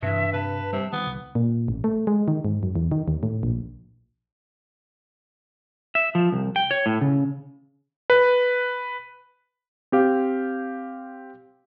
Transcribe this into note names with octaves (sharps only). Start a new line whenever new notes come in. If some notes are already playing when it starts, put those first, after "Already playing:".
G2 C3 E3 E5
C3 B4 A5
C3 G3
D#3 G3 B3
C2
A#2
A1
A3
G#3
D#3
G#2
F#2
E2
D#3
D#2
A2
A#1
E5
F3
C2
G5
C#5
A2
C#3
B4
C4 G4 F5